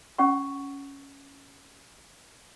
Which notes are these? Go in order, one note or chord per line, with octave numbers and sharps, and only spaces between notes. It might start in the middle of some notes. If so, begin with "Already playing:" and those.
C#4 F#5 C#6